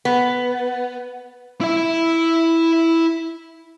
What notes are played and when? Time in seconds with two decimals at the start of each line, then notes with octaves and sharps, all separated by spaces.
0.05 B3
1.61 E4 E5